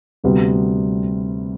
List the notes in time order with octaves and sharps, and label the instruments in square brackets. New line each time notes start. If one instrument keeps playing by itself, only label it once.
[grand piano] D2 C3 G3 B3